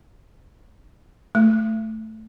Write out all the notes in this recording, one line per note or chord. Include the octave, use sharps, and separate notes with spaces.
A3